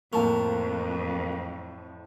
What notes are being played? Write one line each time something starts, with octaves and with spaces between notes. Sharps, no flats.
F2 A2 A#3 A5 C#6